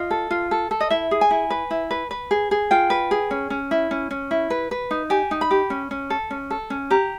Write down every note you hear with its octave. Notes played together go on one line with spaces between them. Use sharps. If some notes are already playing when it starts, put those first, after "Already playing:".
Already playing: F4 D#5
A4
F4
A4
A4
D#5
E4 E5
G#4
G#5
E4
B4
E4
B4
B4
G#4
G#4
F4 G5
B4
G#4
C#4
C#4
E4
C#4
C#4
E4
B4
B4
D#4
G4 G#5
D#4
B5
G4
C#4
C#4
A4
C#4
A4
C#4
G4 A#5